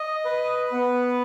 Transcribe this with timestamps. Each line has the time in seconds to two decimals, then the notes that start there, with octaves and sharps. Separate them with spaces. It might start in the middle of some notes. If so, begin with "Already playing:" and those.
Already playing: D#5
0.25 B4
0.72 B3